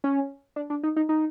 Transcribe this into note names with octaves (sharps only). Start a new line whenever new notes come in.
C#4
D4
D4
D#4
D#4
D#4